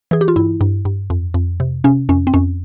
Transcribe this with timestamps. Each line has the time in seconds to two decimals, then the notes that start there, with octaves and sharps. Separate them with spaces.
0.11 E3 G#4
0.21 G4
0.28 F4
0.36 G2 E4
0.61 G2
0.85 G2
1.10 F2
1.34 F2
1.60 C3
1.84 C3 C#4
2.09 F2 C#4
2.27 C4
2.34 F2 C#4